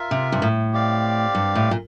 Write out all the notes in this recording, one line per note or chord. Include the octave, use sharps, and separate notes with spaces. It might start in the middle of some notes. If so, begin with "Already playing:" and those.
Already playing: F4 A#4 E5
C3
G2
A2
C4 G4 D5 F5
G2
A2
A#2